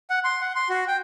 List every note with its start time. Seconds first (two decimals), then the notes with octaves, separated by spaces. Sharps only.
0.10 F#5
0.24 C6
0.41 F#5
0.56 C6
0.69 F#4
0.88 G5